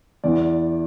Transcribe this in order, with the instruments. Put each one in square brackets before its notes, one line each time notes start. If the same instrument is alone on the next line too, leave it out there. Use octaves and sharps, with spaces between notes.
[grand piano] E2 E3 D5